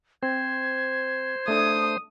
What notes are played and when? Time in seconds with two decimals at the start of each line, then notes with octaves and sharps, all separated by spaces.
0.23 C4 C5 G#6
1.48 A3 D4 A4 D#6